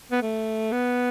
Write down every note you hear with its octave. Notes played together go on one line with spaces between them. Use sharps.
B3
A3
B3